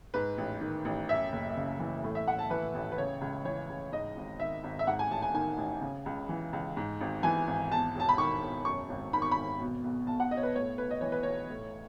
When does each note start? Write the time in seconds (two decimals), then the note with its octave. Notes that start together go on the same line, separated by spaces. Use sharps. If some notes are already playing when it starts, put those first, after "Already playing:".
0.14 G#2 B4
0.38 A1
0.61 D#3
0.85 A1
1.09 F#2 E5
1.32 F#1
1.56 C#3
1.79 E3
2.04 A2
2.15 E5
2.27 A1 F#5
2.39 A5
2.50 E3 B4
2.74 A1
2.92 B4
2.98 C#3 C#5
3.21 C#2
3.45 E3 C#5
3.69 C#2
3.92 G#2 D#5
4.16 G#1
4.40 D#3 E5
4.64 G#1
4.79 E5
4.87 G#2 F#5
4.99 G#5
5.11 A1 A5
5.22 G#5
5.34 D#3 G#5
5.58 A1
5.81 C#3
6.06 C#2
6.29 E3
6.53 C#2
6.77 G#2
7.01 G#1
7.23 E3 G#5
7.47 G#1
7.71 E2 A5
7.95 E1 A5
8.09 B5
8.18 D#3 C#6
8.42 E1
8.65 F#2 C#6
8.89 G#1
9.13 D#3 B5
9.22 C#6
9.31 G#1 B5
9.60 B2
9.84 B1
10.07 B1 A5
10.20 F#5
10.31 B2 D#5
10.37 C#5
10.43 B4
10.55 A2 C#5
10.78 B1 B4
10.90 D#5
11.01 E3 C#5
11.12 B4
11.23 B1 C#5
11.50 A2